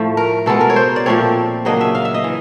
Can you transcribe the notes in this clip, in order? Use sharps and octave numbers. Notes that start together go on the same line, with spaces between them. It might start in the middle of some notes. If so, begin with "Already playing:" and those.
Already playing: A2 F3 A3
A#4
B2 G#3 B3 A4
A#4
C#5
C5
D5
A#2 F3 A3 C4 C#5
C#3 F#3 A#3 D4 D#5
E5
F5
E5
D#5
E3